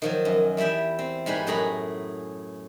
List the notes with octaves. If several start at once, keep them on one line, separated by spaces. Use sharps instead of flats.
D#3 F3 F#3
F#2
E2 G3 E4 E5 G5
C4
G#2 G3 G#3 B4
F#2 A2 G#4 A#5 B5